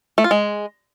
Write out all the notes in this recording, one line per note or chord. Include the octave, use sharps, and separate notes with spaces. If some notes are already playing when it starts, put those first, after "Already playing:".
A3
F4
G#3